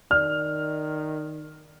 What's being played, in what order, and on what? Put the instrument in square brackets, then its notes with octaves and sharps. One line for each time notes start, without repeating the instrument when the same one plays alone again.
[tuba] D#3 [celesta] D5 [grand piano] F6